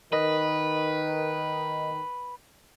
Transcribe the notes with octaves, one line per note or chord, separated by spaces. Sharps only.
D#3 A#4 B4 D#5